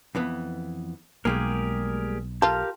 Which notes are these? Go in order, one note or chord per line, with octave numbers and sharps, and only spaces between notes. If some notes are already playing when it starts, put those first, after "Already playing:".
F2 E3 B3
B1 G3 G#3 A#3 G4 G#4 A#4
F4 G4 A4 A#4 F5